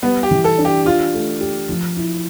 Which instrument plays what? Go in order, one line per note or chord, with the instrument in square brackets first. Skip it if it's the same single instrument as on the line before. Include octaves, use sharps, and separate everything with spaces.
[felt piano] G3 [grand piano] B3
[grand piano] G4
[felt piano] E3
[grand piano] A4
[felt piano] D4
[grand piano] G4
[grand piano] F4 [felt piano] G4
[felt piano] A3
G4
F3
E4